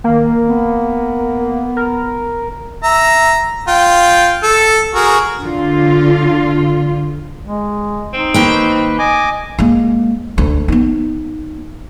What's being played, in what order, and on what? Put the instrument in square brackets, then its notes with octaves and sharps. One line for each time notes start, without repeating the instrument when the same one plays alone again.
[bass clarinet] D#3 [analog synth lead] A#3
[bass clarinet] B3
[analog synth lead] A#4
[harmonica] E5 A#5
F4 G5
A4
F#4 G#4 A#4
[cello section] D3 F4
[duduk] G#3
[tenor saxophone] C4 [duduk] D#4
[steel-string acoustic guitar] D#3 A#3 G5 [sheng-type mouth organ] B4
[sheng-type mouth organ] D#5 G#5 D6
[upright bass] G#3 A#3
D2
B3 D#4